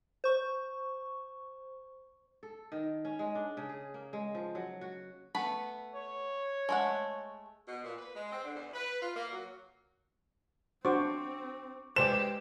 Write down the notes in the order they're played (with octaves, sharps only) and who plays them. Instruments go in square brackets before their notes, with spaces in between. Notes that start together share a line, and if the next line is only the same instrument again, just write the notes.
[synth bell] C5 C#6
[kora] A4
D#3
C#4
G#3
D4
C#3
G#4
A#3
G#3
F3
F#3
F#4
[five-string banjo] A3 B3 B5
[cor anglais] C#5
[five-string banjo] G#3 A3 F#5
[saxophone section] B2
A#2
B4
G#3
C4
D3
E2
B4
F4
A#3
F#3
[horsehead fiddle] C4 [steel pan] D4 F#4 C5 [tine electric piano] C#6 D6
[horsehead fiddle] G#3 G4 [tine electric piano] B4 [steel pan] C5 D5 [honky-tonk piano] E7